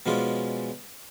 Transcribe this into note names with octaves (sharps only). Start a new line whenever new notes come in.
B2 F3 G#3 C#4 D4 F4